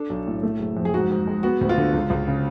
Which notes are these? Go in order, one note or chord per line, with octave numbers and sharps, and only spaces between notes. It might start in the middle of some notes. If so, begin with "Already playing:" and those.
Already playing: D4 A4
B1
A2
A3
F#1
F2
G#4
G#2 F#4
G#2
G#3
B3 F#4
D2
F4
D3
C#2
C#2
C#3